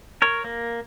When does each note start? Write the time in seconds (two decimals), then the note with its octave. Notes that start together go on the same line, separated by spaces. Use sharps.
0.22 A#4 C#5
0.44 A#3